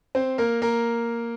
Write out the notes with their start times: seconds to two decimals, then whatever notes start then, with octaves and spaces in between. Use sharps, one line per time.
0.15 C4 C5
0.38 A#3 A#4
0.62 A#3 A#4